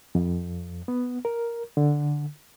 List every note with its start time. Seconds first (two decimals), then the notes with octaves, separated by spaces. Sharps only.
0.15 F2
0.88 B3
1.25 A#4
1.77 D3